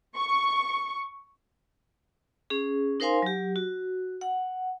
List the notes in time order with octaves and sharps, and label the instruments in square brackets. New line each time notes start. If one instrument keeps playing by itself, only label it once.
[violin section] C#6
[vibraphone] C#4 G#4
D#4 A#4 C5 F5 G#5 C6
F#3 G4
F#4
F#5